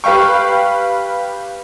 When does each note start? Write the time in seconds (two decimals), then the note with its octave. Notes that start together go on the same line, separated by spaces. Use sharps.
0.04 G4 B4 F5 G5 C#6